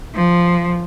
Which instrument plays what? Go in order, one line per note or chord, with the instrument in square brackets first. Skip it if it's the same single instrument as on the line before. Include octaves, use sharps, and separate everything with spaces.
[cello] F3